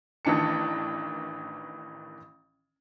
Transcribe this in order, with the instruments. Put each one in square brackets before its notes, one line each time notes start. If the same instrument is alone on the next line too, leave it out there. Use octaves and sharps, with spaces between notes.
[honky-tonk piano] A1 D#3 E3 D4 A5 C#7